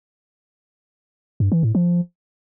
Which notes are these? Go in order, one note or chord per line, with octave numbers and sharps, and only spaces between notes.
G2
E3
A2
F3